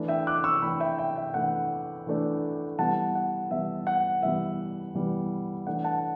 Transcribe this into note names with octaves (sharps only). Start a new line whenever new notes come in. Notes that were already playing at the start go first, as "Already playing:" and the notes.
Already playing: E3 A3 D4
E5 G5
D6 F#6
C#6 E6
E3 A3 D4 G5 B5
E5 G5
E5 G5
E5 G5
E3 A3 D4 F#5
E3 A3 D4
E3 G3 B3 F#5 A5
F#5
E3 G3 B3 E5
F#5
E3 G3 B3 E5
E3 G3 B3
E3 A3 D4 F#5
F#5 A5